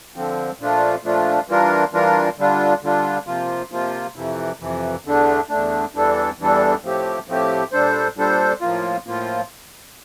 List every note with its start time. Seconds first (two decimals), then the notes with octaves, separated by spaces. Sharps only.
0.16 D3 F3 C4
0.60 A#2 F3 A3 D4 F4
1.04 A#2 F3 A3 D4 F4
1.48 E3 G3 D4 F4 A#4
1.93 E3 G3 D4 F4 A#4
2.38 D3 G3 D4 F4
2.83 D3 G3 D4 F4
3.27 C3 F3 A#3 F4
3.72 C3 F3 A#3 F4
4.16 F2 C3 E3
4.60 F2 C3 E3
5.05 E2 D3 A3 D4
5.49 E2 D3 A3 D4
5.95 E2 E3 G3 D4 A4
6.39 E2 E3 G3 D4 A4
6.83 A2 F3 A3 C4 G4
7.28 A2 F3 A3 C4 G4
7.72 A#2 G3 D4 A4 C5
8.17 A#2 G3 D4 A4 C5
8.61 A2 F3 A#3 F4
9.06 A2 F3 A#3 F4